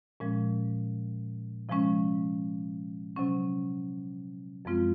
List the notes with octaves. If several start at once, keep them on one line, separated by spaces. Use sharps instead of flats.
A#2 F3 G#3 C#4
C3 F3 G#3 C#4
C3 F#3 C#4
F#2 F3 G#3 C4 F4